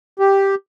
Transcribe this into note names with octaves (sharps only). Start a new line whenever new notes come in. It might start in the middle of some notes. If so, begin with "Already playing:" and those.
G4